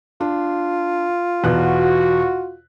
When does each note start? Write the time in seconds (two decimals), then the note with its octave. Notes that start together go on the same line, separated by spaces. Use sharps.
0.21 D4 F4
1.44 E2 B2 F#4 F#6